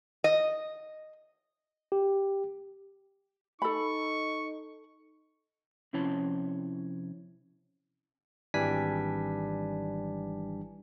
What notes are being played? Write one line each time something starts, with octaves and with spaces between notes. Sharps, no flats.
D#5
G4
D#4 A4 B5 C#6
C3 F3 C#4 E4 C#5 A5
G#1 E3 G3 D4 G#5 B6